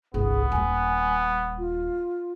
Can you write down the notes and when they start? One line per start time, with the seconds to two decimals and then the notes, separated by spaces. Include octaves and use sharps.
0.14 G1 C2 B3 G#4
0.52 D#1 G3 G#5
1.58 F4